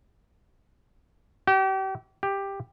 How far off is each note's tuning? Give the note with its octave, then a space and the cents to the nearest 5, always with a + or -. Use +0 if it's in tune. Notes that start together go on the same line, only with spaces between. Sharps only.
G4 -35
G4 +10